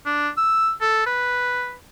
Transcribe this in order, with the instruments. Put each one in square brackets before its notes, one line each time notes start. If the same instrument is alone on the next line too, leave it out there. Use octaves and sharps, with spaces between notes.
[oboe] D4
E6
A4
B4